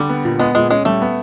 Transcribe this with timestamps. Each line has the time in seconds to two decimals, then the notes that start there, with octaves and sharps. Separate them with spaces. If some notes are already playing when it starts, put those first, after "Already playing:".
Already playing: D3 G3
0.10 B3
0.25 A#2
0.39 G#3 B3
0.55 A#2 G#3
0.70 G#3 C#4
0.85 G3 A3
1.02 B3